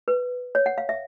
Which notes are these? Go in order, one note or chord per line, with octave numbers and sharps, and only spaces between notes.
B4
C#5
F#5
F5
E5